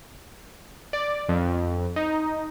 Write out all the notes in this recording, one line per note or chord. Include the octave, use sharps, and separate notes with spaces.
D5
F2
D#4